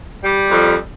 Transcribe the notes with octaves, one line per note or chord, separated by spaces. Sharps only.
G3
F2